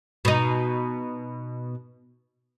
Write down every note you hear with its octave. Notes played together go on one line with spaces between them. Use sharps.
B2 D#4